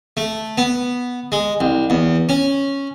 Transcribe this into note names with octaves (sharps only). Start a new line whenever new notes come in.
A3
B3
G#3
C2
E2
C#4